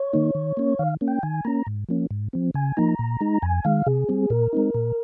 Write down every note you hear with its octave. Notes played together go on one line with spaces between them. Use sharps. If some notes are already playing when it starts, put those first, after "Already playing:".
Already playing: C#5
D#3 A#3 D#4
D#3
A#3 C#4
D#3 F5
A#3 C#4
G5
D#3 G#5
A#3 C#4 A#5
G#2
F3 A#3 C#4
G#2
F3 C4
C#3 G#5
F3 A#3 D#4 A#5
A#2
G#3 D#4
F2 G#5
D#3 G#3 F5
C3 G#4
G3 C4
A#2 A#4
G#3 C4 D#4
A#2